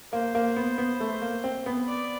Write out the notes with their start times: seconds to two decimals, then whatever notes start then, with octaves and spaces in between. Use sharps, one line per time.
0.13 A#3 C5
0.35 A#3
0.56 B3
0.78 B3
1.00 A3
1.22 A#3
1.44 C4
1.66 B3
1.88 D5